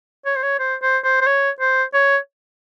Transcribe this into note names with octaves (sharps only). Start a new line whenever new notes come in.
C#5
C5
C#5
C5
C5
C5
C5
C#5
C5
C#5